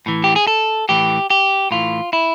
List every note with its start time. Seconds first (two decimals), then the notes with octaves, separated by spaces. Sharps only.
0.06 A2 E3
0.24 G4
0.36 G#4
0.47 A4
0.89 A2 E3 G4
1.30 G4
1.71 A2 E3 F4
2.13 E4